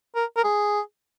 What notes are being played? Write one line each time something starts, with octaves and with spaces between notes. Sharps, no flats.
A#4
A#4
G#4